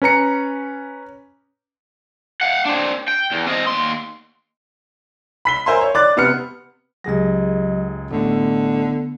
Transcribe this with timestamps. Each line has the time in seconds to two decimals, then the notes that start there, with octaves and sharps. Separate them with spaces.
0.02 C#4 B4 A#5 C#7
2.41 F5 F#5
2.66 C4 D4
3.08 G5
3.31 E2
3.46 C4 D#5
3.66 D#2 C6
5.45 B5 B6 G7
5.66 A#4 C5 E5 G#5 A#5 C6
5.81 C#5
5.94 D5 D6 F#6 A6
6.17 C3 B3 F6 C#7
7.04 C#2 F#3 G4 G#4 D#5 A#6
8.11 A1 D3 A3 B3